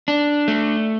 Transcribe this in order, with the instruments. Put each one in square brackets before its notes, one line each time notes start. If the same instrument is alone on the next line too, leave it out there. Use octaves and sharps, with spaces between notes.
[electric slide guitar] D4
A3